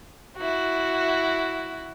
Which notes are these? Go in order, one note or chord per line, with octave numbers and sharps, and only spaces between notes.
E4 F#4